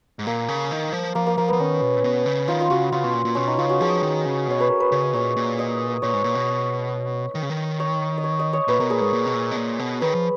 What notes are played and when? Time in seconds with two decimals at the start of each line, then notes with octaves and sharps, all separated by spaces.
0.19 G#2
0.27 A#2 A#3
0.48 C#3
0.71 D#3
0.92 F3
1.15 F3 A#3
1.27 A#3
1.37 F3 A#3
1.48 F3 B3
1.59 D#3 C#4
1.81 B2
1.96 A#2
2.04 B2
2.26 C#3
2.47 D#3 F4
2.61 F4
2.70 C#3 F#4
2.92 C#3 F4
3.04 B2
3.14 A#2
3.25 A#2
3.35 B2 C#4
3.47 D#4
3.58 C#3 F4
3.69 F#4
3.81 F3 G#4
4.03 D#3
4.25 C#3
4.47 B2 C#5
4.60 B4
4.70 A#4
4.80 B4
4.92 C#3 C#5
5.03 D#5
5.14 A#2 C#5
5.36 A#2
5.59 D#5
6.02 A#2 C#5
6.13 G#2
6.24 A#2
6.35 B2
7.35 D#3
7.43 C#3
7.50 D#3
7.80 C#5
8.18 D#5
8.24 C#5
8.39 D#5
8.53 C#5
8.68 A#2 B4
8.80 B2 A#4
8.90 A#2 G#4
9.01 G#2 A#4
9.13 A#2
9.26 B2
9.34 A#2
9.51 B2
9.57 A#2
9.79 B2
10.01 D#3 B4
10.15 F3